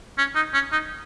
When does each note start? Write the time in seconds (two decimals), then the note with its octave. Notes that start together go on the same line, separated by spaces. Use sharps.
0.18 C#4
0.35 D#4
0.54 C#4
0.72 D#4